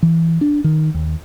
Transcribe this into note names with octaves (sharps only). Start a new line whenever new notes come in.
E3
D4
D#3
D#2